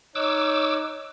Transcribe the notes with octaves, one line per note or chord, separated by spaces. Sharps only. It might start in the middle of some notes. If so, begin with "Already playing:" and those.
D#4 C#5 D6 E6 F#6